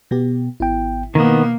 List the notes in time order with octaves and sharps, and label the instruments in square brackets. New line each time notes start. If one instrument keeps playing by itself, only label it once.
[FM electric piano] B2 B3 G4
[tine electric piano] G#1 B3 G5 [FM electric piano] E4
[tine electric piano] B2 [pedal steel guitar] D#3 B3 [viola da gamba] A#3